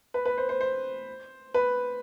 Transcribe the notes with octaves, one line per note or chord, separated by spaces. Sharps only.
B4
B4
C5
C5
C5
B4